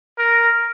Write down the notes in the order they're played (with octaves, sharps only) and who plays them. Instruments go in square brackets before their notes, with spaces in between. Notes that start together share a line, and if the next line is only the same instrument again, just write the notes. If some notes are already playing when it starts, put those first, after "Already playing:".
[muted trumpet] A#4